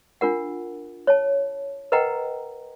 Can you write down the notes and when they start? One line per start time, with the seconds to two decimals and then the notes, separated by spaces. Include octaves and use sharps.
0.21 D4 F4 A#4 F#5
1.07 C#5 A5
1.92 A#4 B4 D#5 F#5 G5 A#5